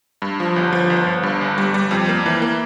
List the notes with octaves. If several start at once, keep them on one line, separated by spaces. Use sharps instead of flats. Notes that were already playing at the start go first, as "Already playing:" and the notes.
G2
F3
G1
F3
G1
G1
G2
G1
G3
G3
F2
A#3
E3
A#3